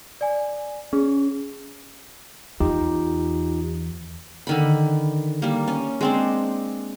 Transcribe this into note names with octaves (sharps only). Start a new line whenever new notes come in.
D5 G#5
C#4 G#4
E2 D#4 F4 G4
D3 D#3 B5
G3 A#3
C#4
G#3 C4 D4